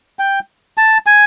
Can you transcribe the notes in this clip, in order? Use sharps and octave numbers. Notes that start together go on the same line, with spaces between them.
G5
A5
G#5